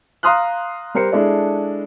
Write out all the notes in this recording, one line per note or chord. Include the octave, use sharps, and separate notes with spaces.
F5 A#5 C6 D#6 F6 F#6
G3 A#4 C5 C#7
G#3 D4 E4 A4 D5 E5